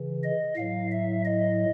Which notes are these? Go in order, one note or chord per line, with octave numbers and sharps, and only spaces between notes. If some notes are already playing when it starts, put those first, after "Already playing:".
Already playing: C#3 E3
D#5
A2 F#3 F5
E5
D#5